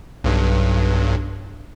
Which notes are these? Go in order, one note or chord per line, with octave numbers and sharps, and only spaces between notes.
B1 G2